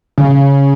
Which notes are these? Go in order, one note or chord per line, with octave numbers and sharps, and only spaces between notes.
C#3